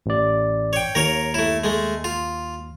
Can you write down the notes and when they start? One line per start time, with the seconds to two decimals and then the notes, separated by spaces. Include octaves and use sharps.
0.06 A1 D5
0.73 C#5 G5
0.95 D#2 A#4 C#5 A#5 A#6
1.34 A3 E4
1.64 G#3 A3
2.04 F4